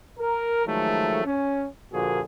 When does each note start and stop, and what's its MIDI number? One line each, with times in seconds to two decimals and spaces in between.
0.17 0.62 70
0.66 1.23 51
0.66 1.23 53
0.66 1.23 54
0.66 1.23 56
0.66 1.23 57
1.25 1.67 61
1.92 2.19 46
1.92 2.19 50
1.92 2.19 53
1.92 2.19 58
1.92 2.19 66
1.92 2.19 68